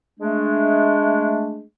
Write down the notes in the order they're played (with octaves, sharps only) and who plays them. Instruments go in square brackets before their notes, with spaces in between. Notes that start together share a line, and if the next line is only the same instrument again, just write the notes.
[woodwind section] G#3 A3 D4